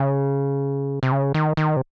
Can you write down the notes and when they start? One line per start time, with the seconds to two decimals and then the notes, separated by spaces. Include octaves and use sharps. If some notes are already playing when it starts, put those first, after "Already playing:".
Already playing: C#3
1.03 C3
1.12 C#3
1.34 D#3
1.57 D#3
1.76 C3